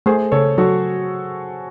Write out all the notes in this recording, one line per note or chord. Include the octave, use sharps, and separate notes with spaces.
A3 G#4 C5
C#3 A4 C#5
F#3 F#4 A4